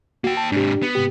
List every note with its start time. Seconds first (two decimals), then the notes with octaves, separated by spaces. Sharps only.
0.24 A#3 F#4 G5
0.37 A5
0.52 G#2 C3 D4 G4
0.83 B3
0.95 G#2 C3 G4